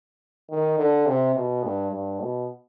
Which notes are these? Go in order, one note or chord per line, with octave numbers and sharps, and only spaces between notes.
D#3
D3
C3
B2
G2
G2
B2